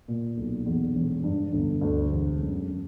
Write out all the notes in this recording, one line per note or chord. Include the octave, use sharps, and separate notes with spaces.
A#2
B1
E2
E1
G2
G1
D2
E1
F#2